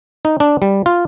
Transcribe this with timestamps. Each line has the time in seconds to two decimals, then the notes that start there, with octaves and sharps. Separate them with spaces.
0.25 D#4
0.40 D4
0.62 G3
0.86 F4